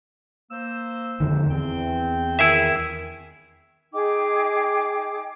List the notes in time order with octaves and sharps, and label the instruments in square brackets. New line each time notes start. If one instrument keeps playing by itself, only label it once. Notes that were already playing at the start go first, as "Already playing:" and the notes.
[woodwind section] A#3 C5 E6
[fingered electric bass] F2 D3 D#3
[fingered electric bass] E2 [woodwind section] C4 G5
[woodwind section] D#3 [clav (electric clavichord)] E4 G#4 E5
[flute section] D#4 G#4 G5 D6